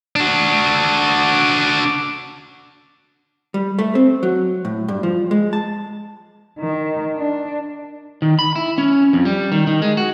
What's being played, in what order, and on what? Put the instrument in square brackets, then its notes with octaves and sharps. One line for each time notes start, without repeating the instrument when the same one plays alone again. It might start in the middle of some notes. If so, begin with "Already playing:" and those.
[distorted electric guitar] D4 F#4
[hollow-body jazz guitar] G3
A3
C4
F#3
A2
G2
F3
G#3
A5
[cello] D#3
D4
[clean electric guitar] D#3
B5
E4
C#4
F2
G3
D#3
D#3
G#3
F#4